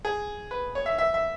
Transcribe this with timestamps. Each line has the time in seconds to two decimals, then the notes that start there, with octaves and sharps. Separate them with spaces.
0.05 G#4
0.51 B4
0.75 C#5
0.86 E5
0.98 E5
1.14 E5